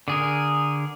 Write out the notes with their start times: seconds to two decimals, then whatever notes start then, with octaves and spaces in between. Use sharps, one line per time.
0.08 D3 G#4 A#4